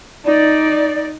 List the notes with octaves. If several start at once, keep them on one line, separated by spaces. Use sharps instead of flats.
D#4 D5